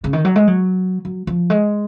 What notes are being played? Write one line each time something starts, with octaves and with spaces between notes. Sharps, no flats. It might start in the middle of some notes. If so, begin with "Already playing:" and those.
C#3
D#3
F#3
G#3
F#3
F#3
F3
G#3